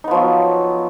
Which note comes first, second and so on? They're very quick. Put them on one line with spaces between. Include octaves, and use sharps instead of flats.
D#4 B3 F3 F#3